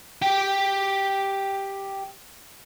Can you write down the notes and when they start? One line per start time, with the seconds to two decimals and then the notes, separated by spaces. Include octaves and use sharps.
0.22 G4 G5